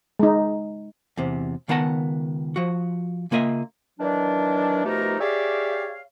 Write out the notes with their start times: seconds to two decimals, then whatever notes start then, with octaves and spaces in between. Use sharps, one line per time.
0.19 G#3 D#4
1.17 E2 C3
1.68 C#2 D#3 B3 F#5 A5 A#5
2.56 F3 F#4
3.31 C#3 A#3 F4 D#5 E5
4.00 D#3 E3 F#3 D4
4.85 B2 F3 A3 D#4 G4 A#4
5.21 G4 G#4 C#5 D5 E5 F5